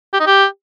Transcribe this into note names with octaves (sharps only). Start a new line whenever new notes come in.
G4
D#4
G4